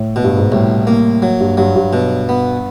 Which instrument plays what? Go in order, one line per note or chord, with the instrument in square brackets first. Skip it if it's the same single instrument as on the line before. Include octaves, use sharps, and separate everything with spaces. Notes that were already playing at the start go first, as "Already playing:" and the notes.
Already playing: [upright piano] A2
[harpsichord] B2
[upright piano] G2
G#2
[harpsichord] C2 [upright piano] A2
[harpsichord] A#3
F#3
[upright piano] G2
[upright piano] G2 [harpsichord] F#3
[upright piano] G2
[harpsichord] B2
B3